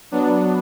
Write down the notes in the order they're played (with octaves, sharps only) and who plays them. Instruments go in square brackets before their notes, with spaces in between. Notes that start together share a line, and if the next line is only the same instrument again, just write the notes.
[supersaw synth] F#3 B3 D4